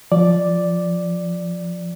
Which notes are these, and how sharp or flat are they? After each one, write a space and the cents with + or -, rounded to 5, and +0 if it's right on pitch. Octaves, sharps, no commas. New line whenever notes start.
F3 +0 D5 +0